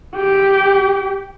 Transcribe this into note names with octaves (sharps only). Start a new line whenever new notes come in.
G4